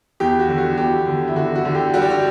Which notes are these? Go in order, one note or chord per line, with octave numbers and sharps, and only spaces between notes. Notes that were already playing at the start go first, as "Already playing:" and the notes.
E2 G4
F#4
D3
F#4
E2 G4
D3
E4
D3 F#4
F#4
D3
G4
G3 F#4
G4
F#4